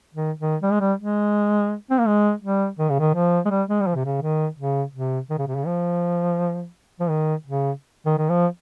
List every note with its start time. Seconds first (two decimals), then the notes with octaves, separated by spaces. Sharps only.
0.14 D#3
0.40 D#3
0.63 G3
0.72 G#3
0.80 G3
0.98 G#3
1.90 C4
1.98 A#3
2.07 G#3
2.42 G3
2.79 D#3
2.89 C#3
2.99 D#3
3.15 F3
3.45 G#3
3.50 G3
3.69 G#3
3.81 G3
3.87 F3
3.95 C3
4.05 C#3
4.22 D#3
4.58 C#3
4.94 C3
5.30 D#3
5.38 C#3
5.47 C3
5.57 C#3
5.66 F3
7.00 F3
7.09 D#3
7.46 C#3
8.06 D#3
8.18 D#3
8.30 F3